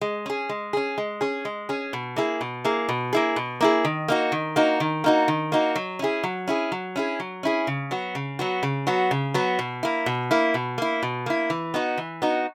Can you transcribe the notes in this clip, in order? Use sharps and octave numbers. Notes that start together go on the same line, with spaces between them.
G#3
C#4 G#4
G#3
C#4 G#4
G#3
C#4 G#4
G#3
C#4 G#4
B2
A#3 E4 G#4
B2
A#3 E4 G#4
B2
A#3 E4 G#4
B2
A#3 E4 G#4
D#3
A#3 D#4 F#4
D#3
A#3 D#4 F#4
D#3
A#3 D#4 F#4
D#3
A#3 D#4 F#4
F#3
C#4 E4 G#4
F#3
C#4 E4 G#4
F#3
C#4 E4 G#4
F#3
C#4 E4 G#4
C#3
F#3 B3 F#4
C#3
F#3 B3 F#4
C#3
F#3 B3 F#4
C#3
F#3 B3 F#4
B2
A#3 E4
B2
A#3 E4
B2
A#3 E4
B2
A#3 E4
E3
B3 D#4 F#4
E3
B3 D#4 F#4